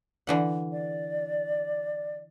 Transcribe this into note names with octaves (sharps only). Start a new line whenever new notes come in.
D3 E3 F#5
D5